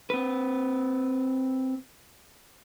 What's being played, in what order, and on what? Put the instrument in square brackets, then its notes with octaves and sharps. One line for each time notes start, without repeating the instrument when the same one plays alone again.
[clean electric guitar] C4 B4